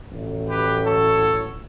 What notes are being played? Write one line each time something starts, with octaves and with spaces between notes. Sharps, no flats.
A1 A2 F#3
G4 B4
A4 C#5